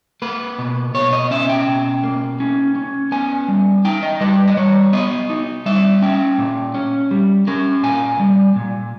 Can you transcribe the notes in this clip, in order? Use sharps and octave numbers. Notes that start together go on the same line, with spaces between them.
A#3 B4
B2
B2 C#5
D#5
C#4 E5
G5
B2
A#3
C#4
C#4
B3 G#5
G3
D#4 G5
D#5
G3 B4
D#5
G3 C#5
B3 D#5
D#4
G3 E5
C#4 G5
A#2
C#4
G3
C#4 A#4
A#2 G#5
G3
A#2